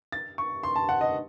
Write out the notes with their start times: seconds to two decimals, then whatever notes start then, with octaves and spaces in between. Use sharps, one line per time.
0.12 A6
0.38 C#6
0.63 C6
0.76 A5
0.89 F#5
1.01 D#5